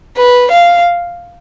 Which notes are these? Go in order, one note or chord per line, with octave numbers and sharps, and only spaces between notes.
B4
F5